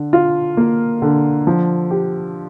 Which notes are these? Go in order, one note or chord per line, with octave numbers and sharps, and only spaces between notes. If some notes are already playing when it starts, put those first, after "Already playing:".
Already playing: D3
F4
A#3
D3
F3
G4